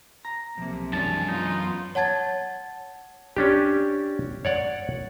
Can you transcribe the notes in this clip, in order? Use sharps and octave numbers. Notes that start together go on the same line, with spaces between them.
A#5
B1 C3 F3 A#3
F#2 E3 G#3 C#4 D4 A5
B3 D#4 F4
C#5 F#5 A5 G#6 A6
C#4 D4 G4
C#5 D5 F#5